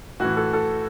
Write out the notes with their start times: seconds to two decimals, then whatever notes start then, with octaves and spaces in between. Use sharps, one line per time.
0.20 A2 E3 F#4
0.37 A4
0.53 A4